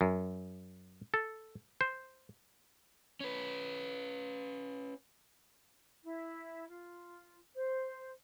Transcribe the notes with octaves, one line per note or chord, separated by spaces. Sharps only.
F#2
A4
C5
C#4 B4
E4
F4
C5